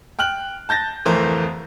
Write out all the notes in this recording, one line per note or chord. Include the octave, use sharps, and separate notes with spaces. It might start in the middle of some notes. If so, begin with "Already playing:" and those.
G5 F6 F#6 F#7
A5 G6 A6 A#6
D1 F2 E3 A3 A#4 C5